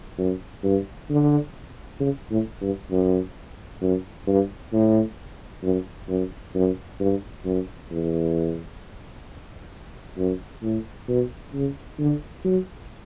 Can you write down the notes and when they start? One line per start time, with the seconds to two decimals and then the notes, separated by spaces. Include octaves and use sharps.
0.18 F#2
0.63 G2
1.10 D3
2.00 C#3
2.31 A2
2.61 G2
2.91 F#2
3.81 F#2
4.27 G2
4.73 A2
5.63 F#2
6.09 F#2
6.55 F#2
7.00 G2
7.45 F#2
7.91 E2
10.18 F#2
10.63 A2
11.08 B2
11.53 C#3
11.99 D3
12.45 F#3